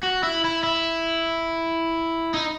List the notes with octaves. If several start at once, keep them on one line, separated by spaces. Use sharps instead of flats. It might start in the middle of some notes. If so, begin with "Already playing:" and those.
F#4
E4
E4
E4
D#4